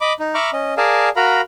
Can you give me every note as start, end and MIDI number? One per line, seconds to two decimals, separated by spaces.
0.01 0.13 75
0.01 0.13 83
0.01 0.13 86
0.20 0.34 63
0.35 0.50 76
0.35 0.50 82
0.35 0.50 83
0.35 0.50 85
0.35 0.50 86
0.35 0.50 89
0.53 0.74 61
0.53 0.74 75
0.77 1.09 68
0.77 1.09 70
0.77 1.09 74
0.77 1.09 77
0.77 1.09 80
0.77 1.09 81
1.16 1.41 66
1.16 1.41 70
1.16 1.41 77
1.16 1.41 82
1.16 1.41 83